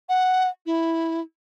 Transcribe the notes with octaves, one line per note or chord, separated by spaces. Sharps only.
F#5
E4